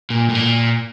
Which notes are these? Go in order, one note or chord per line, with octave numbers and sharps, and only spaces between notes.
A#2
A2
A#2